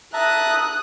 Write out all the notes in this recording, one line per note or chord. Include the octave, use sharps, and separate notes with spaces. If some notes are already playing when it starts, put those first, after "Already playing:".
E5 A5 A#5 D#6 F#6